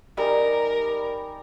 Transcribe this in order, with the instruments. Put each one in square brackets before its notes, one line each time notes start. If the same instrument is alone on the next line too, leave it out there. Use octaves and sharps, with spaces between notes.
[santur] G3 D#4 G#5 [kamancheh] A#4